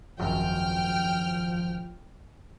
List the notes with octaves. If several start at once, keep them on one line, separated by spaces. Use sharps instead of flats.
G#1 C#2 F#2 F3 G5 F6